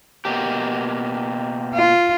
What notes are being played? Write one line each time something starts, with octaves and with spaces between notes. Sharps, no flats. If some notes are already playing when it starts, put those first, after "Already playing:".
B2 A#3 G4
F4